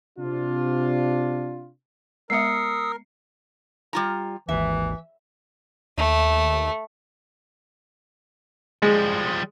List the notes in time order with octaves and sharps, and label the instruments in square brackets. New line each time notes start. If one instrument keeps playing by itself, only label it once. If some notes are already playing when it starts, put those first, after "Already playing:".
[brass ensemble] C3 D4 F4
[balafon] G#3 B3 E5 [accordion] A#4 [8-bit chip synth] D#6 E6 [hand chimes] C7 C#7
[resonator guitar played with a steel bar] G3 F4 A#5
[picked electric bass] G#1 D#2 [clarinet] E3 [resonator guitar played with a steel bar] E5
[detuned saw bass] D#2 [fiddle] A3
[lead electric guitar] F3 G3 [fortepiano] G#3